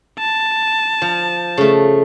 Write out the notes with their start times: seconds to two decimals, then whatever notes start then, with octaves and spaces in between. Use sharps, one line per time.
0.19 A5
1.02 F3
1.57 C#3 A3